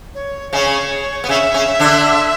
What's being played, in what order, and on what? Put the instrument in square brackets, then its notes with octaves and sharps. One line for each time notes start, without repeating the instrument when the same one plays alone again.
[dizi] C#5
[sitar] C#3 C#4 [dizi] C#5 E5
[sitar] B3
[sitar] C#3 C#4 [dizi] E5
[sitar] C#3 C#4
D3 D4